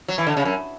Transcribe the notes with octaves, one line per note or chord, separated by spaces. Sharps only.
F#3
E3
D3
C#3
F#2